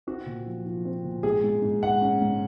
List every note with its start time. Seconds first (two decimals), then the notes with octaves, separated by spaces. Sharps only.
0.07 C4 F#4
0.26 A#2
0.46 F3
0.66 F3
0.85 C4
1.04 A#2
1.23 G#2 G#4
1.44 G#2
1.62 G#2
1.83 G#2 F#5
2.02 C#4
2.22 G#2